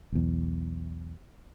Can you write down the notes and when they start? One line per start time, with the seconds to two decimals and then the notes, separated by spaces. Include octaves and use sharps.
0.12 B1 E2